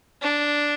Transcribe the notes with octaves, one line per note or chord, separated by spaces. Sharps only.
D4